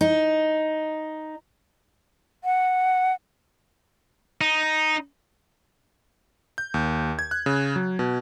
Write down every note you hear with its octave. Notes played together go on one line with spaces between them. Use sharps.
D#4
F#5
D#4
G6
D#2
G#6
F#6
C#3
F#3
B2